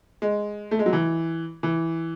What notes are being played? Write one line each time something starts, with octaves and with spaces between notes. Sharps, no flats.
G#3
A3
G#3
F#3
E3
E3